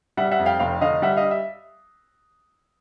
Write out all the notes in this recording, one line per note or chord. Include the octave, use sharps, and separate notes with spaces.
G3 E5 F#5
E5 F#5
F2
F5 G5
F1 F5 G5
D3 D#5 F5
G3 E5 F#5
D#5 F5
E5